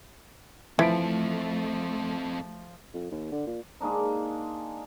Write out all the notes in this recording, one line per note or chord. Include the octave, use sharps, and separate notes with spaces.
E3 F3 A3 C4 A4 B6 D7
F2
D#2
D3
A#2
G#3 A#3 D4 D#4